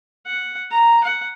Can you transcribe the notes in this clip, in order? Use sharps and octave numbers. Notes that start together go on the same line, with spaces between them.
F#5
A#5
F#5